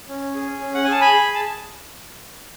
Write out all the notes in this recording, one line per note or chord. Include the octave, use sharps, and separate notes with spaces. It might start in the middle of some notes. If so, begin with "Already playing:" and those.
C#4
G#4
C#4
F#5
G#5
G#4 A5
G#5 B5
G#4
A5